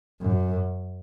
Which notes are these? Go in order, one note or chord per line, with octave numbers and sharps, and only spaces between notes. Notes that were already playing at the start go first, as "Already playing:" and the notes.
F#2